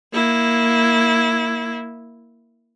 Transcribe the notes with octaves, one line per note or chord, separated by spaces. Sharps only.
A#3 E4